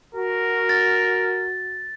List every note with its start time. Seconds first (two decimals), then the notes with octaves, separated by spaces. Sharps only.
0.15 F#4 A#4
0.69 A6